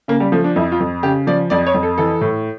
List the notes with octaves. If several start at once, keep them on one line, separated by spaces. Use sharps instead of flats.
C#3 A#3
G3
F3 A3
D4
F2 E4
F4
F2
C#3 G4
F3 D5
F2 D5
C#5
F2
A4
E3 A4
A2